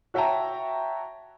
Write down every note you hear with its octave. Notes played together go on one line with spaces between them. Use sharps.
F#4 C#5 E5 G5 A5 A#5